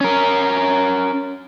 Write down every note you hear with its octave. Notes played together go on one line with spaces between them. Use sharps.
C#4 A#4